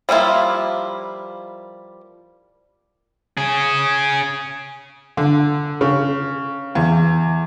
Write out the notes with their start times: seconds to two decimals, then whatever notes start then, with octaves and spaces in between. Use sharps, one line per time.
0.09 F3 G3 A#3 E4 F4
3.37 C#4 G#4
5.17 D3
5.81 C#3
6.75 E2